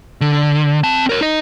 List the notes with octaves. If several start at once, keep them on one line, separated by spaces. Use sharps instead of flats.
D3
C4 A5
A#4 C#5
D#4 D#5